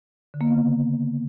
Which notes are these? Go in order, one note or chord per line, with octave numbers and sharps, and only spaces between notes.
D3
A#3
B3
C#3